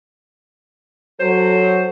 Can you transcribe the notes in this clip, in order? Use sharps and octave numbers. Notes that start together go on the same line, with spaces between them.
F#3 A4 C5